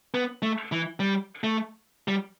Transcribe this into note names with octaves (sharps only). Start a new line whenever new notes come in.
B3
A3
E3
G3
A3
G3